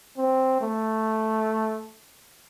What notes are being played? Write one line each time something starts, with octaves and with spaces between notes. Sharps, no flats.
C4
A3